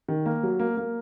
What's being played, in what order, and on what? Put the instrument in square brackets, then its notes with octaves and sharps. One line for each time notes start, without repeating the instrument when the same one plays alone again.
[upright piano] D#3
A#3
F#3
A#3
A#3